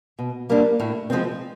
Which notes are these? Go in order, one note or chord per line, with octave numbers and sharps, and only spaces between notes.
B2
G3 A#3 D4
A2
F3 G#3 C4